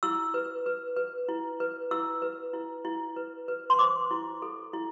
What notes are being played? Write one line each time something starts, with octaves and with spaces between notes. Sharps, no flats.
E4 E6
B4
B4
B4
E4
B4
E4 E6
B4
E4
E4
B4
B4
C6
C5 D6
E4
A4
E4